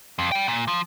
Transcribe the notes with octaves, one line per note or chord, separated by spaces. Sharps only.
F2
G3 G5
A#2
F3